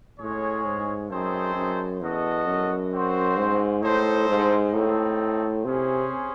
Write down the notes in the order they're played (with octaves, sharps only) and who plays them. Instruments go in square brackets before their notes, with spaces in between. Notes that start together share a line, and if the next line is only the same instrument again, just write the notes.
[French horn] A2 [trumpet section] G#3 C#4 G#4 C#5
[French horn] G#2
[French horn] F#2 [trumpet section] A3 C4 D#4 G#4 C5
[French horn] F#2
[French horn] E2 [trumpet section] F#4 A4 D#5
[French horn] F#2
[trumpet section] C4 F#4 C5
[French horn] G#2
[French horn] A2 [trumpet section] D#4 A4 C5
[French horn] G#2
[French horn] A2 [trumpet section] A3 C4 D#4
[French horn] C3 [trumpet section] C#4 G#4 C5